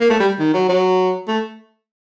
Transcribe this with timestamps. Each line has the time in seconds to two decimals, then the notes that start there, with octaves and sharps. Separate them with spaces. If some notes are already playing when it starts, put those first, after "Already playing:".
0.01 A#3
0.10 A3
0.20 G3
0.40 D#3
0.54 F#3
0.69 F#3
1.28 A3